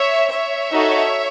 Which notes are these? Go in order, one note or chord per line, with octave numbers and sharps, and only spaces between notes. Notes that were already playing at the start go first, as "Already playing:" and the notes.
Already playing: C#5 E5
C#5 E5
D#4 F#4 A4